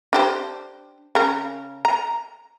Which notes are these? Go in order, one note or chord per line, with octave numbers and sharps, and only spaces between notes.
D4 G4 C5
C#3 A#4
A#5